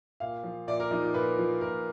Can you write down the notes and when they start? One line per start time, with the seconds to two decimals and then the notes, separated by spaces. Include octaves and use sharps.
0.20 A#2 F5
0.43 F3
0.67 A#2 D5
0.80 A#4
0.91 F3 D#4
1.03 F4
1.14 A#2 B4
1.38 F3
1.61 A#2 A#4